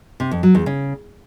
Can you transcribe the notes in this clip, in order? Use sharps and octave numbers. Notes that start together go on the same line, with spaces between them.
C3
F2
F#3
E2
C#3